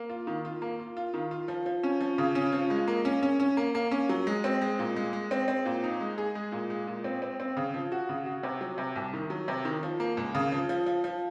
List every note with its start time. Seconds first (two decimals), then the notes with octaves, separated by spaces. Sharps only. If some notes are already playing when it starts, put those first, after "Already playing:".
Already playing: A#3
0.10 F4
0.27 D#3
0.45 F4
0.62 A#3
0.80 F4
0.97 F4
1.14 D#3
1.31 F4
1.48 F3
1.66 F3
1.83 C#4
2.01 F3
2.18 C#3
2.35 C#4
2.52 F3
2.70 G#3
2.88 A#3
3.05 C#4
3.23 C#4
3.40 C#4
3.57 A#3
3.75 A#3
3.91 C#4
4.09 F#3
4.27 G#3
4.44 C4
4.62 G#3
4.79 A#2
4.96 G#3
5.13 G#3
5.31 C4
5.48 C4
5.65 A#2
5.84 D#4
6.01 G#3
6.18 G#4
6.35 G#3
6.52 A#2
6.70 G#3
6.87 A#2
7.04 C4
7.22 C4
7.40 C4
7.57 C#3
7.74 F3
7.92 F#4
8.09 C#3
8.26 F#4
8.43 C3
8.61 F#3
8.78 C3
8.96 C2
9.14 D#3
9.30 F#3
9.48 C3
9.65 D#3
9.83 F3
10.00 A#3
10.17 C#2
10.35 C#3
10.52 F3
10.69 F3
10.86 F3
11.04 F3